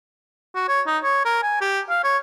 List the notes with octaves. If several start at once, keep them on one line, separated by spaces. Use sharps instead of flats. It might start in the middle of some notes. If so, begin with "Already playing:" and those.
F#4
C#5
D#4
C#5
A#4
G#5
G4
F5
C#5